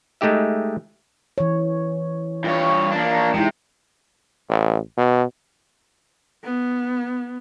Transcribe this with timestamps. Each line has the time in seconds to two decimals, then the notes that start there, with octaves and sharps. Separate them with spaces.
0.21 G#3 A3 D#4 G4 E5
1.38 E3 C#5
2.44 G2 F4 C#5
2.91 A#3 D4
3.34 C3 G#3 D#4 E4
4.49 A1
4.97 B2
6.44 B3